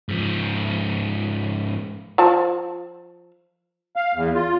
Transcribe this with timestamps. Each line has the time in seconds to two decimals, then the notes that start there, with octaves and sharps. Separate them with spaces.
0.09 G#2 F3
2.18 F3 F4 A5
3.96 F5
4.15 E2
4.35 F4